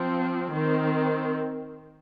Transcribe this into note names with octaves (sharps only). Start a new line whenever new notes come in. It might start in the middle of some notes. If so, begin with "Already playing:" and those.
Already playing: F3 C4
D#3 C4